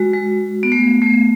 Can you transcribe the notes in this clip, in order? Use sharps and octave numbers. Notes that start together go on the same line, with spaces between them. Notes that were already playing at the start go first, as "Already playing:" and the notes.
Already playing: G#3 F#4
G#3
B3
A3
A3